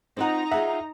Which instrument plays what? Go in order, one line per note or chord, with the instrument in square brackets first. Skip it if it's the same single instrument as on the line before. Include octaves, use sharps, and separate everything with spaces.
[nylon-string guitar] C4 F4 F#5 [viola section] D#4 A#5
[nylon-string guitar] F4 G#4 F#5 [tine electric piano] E5